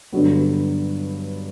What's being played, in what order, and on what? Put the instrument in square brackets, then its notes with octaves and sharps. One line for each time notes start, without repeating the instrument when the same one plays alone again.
[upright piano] G2 D3 F#3 B3